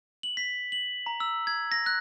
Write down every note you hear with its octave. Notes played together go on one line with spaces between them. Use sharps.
F#7
B6
F#7
A#5
E6
G#6
A#6
F#6